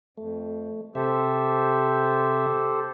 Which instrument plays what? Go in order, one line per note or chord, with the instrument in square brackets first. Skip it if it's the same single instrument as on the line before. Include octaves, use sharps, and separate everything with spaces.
[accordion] F2 [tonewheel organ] A3
[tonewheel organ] C3 E5 [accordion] G4 A4 C5